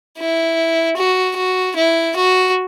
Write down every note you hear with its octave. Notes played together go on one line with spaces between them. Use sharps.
E4
F#4
F#4
E4
F#4